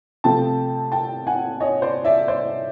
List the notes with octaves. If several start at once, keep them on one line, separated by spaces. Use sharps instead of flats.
C3 F3 A3 C4 G5 A5
G5 A5
F#5 G#5
C#5 D#5
C5 D5
D5 E5
C5 D5